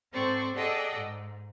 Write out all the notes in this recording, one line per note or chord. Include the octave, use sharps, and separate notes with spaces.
G#2 C4 A4 C5 D5 C#6
G#4 A4 D5 D#5 F#5 G5
G#2